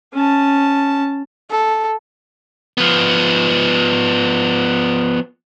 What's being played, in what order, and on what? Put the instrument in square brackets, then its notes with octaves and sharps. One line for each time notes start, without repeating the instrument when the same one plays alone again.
[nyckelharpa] C#4 A5
[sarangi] A4
[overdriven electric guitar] F3 B3